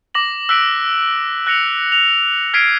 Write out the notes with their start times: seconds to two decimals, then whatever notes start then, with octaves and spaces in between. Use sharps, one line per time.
0.15 D6 A#6 F#7
0.49 E6 F#6 B6 D7
1.47 F#6 A#6 C#7 F7
1.92 F7
2.54 F6 G#6 B6 C7 D7 D#7